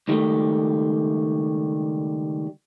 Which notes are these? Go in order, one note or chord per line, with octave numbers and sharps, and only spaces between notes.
C#2 D#3 F#3 G3 A3